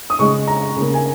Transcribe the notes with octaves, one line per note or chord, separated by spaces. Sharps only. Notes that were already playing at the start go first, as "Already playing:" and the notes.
D#6
C#3 G#3 C#6
A#5
C#3
A#3
G#5